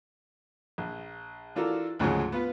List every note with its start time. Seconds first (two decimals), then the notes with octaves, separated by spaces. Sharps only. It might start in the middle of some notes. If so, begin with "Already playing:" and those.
0.78 A#1
1.55 E3 D4 F4 F#4 A4 A#4
1.99 D2 G#2 C#3 F3 F#3 G#3
2.32 B3 F4 B4